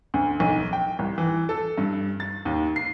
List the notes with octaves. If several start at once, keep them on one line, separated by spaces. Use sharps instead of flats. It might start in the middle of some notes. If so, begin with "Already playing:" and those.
D2
B1
G5
C2
E3
A4
G2
A6
D#2
C7